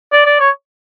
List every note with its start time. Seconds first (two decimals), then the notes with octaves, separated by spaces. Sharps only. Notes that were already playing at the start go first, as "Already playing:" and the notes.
0.13 D5
0.26 D5
0.40 C#5